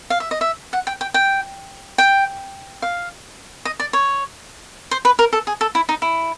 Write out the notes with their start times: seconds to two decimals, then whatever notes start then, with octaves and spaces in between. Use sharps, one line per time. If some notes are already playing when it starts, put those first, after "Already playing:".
0.10 F5
0.20 E5
0.31 D#5
0.41 E5
0.73 F#5
0.87 G5
1.01 G5
1.14 G5
1.98 G5
2.82 F5
3.65 D#5
3.80 D5
3.93 C#5
4.91 C5
5.05 B4
5.19 A#4
5.33 A4
5.47 G#4
5.61 A4
5.75 E4
5.89 D#4
6.02 E4